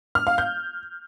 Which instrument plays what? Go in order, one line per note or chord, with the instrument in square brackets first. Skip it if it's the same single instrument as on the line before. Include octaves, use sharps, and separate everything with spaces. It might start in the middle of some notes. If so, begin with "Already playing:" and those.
[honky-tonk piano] F6
F5
G6